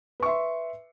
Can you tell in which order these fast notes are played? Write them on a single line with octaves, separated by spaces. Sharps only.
B4 C#6 E5 C6